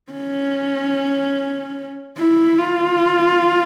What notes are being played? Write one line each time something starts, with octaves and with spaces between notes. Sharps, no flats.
C#4
E4
F4